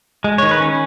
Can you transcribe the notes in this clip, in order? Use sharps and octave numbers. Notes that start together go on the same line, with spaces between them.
G#3
D#3 C#5
B4
C#4